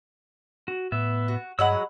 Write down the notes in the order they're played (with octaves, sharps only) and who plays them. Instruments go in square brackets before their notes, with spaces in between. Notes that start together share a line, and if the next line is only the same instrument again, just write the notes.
[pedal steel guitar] F#4
[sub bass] A2 [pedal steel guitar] B3 E5
[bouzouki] F#4
[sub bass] G2 [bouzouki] F#3 G#3 F#5 [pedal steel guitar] B5 E6